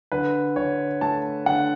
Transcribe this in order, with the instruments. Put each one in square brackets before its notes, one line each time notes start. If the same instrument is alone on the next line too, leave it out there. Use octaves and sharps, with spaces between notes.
[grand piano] D3 B4
D3 C#5
A3 A5
D3 F#5